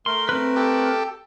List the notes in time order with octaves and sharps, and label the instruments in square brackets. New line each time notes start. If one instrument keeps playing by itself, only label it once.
[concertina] A3 A#4 [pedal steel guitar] C6
[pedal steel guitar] C4 B4
[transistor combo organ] G4 A4